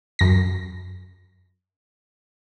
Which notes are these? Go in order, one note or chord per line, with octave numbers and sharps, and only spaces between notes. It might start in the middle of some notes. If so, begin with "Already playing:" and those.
F#2 A#6